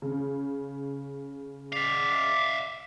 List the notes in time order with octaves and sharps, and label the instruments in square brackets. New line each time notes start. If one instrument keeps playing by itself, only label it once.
[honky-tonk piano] C#3
[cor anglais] D5 [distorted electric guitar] E5 F5